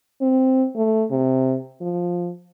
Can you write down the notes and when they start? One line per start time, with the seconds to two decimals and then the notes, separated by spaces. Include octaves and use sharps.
0.22 C4
0.76 A3
1.11 C3
1.81 F3